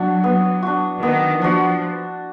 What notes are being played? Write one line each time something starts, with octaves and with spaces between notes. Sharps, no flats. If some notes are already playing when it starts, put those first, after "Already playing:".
Already playing: F#3 D4 F#4
B3
D4 F#4
D#3 B3
F3 D4 F#4